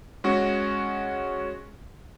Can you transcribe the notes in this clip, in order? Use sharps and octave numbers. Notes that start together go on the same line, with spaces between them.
G#3 C#4 F#4